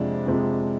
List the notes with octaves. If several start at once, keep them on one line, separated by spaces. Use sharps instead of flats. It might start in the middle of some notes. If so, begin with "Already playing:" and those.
Already playing: F2 C3 F3 G#3 D4
F2 C3 F3 G#3